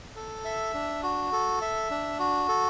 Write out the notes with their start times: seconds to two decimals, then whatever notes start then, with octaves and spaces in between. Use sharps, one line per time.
0.16 A4
0.45 E5
0.74 D4
1.03 F#4
1.32 A4
1.62 E5
1.91 D4
2.19 F#4
2.49 A4